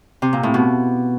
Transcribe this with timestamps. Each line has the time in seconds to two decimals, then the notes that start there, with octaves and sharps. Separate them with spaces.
0.22 C3
0.33 A#2
0.43 A2
0.54 B2